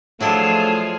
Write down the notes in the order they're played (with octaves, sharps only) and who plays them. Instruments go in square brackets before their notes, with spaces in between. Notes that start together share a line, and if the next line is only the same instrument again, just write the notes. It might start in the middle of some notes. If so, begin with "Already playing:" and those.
[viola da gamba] F3 F4 G#4 [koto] F#3 D4 E4 [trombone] A3 [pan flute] A5